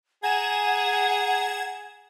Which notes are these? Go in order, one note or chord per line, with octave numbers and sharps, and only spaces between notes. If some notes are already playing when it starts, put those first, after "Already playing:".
G#4 F#5 G#5 A#5 G#6 E7